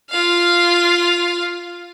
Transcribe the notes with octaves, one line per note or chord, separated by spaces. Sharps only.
F4 F5